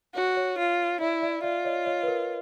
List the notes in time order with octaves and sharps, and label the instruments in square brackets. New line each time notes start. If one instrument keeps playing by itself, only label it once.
[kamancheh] F#4 [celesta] C#5
[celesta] C#5
[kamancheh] F4
[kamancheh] E4 [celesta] D5 E5
[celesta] D5 E5
[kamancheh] F4 [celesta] D5 E5
[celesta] C#5 D#5
C#5 D#5
B4
A#4